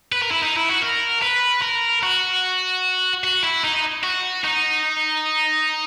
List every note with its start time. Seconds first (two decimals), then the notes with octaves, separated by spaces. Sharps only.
0.12 B4
0.22 A#4
0.31 E4
0.42 D#4
0.56 E4
0.69 F#4
0.81 A#4
1.22 B4
1.62 A#4
2.03 F#4
3.24 F#4
3.43 E4
3.64 D#4
4.03 F#4
4.44 D#4